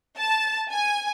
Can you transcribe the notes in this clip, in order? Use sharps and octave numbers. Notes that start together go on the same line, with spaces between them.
A5
G#5